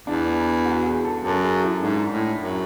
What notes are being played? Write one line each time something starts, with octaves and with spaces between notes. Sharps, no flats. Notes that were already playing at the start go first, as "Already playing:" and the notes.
E2 D4
F#4
G#4
A4
F#2 A4
G#4
E4
G#2 D4
A2
F#2